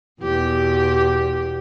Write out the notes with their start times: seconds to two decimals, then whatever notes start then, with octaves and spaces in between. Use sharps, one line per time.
0.21 E2 B2 G4